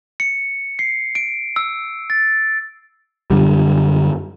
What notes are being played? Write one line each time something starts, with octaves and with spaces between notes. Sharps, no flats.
C#7
C7
D7
E6
A6
F#2 D3 G3